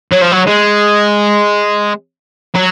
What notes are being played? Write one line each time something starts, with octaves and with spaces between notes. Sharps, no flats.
F#3
F3
F#3
G#3
F#3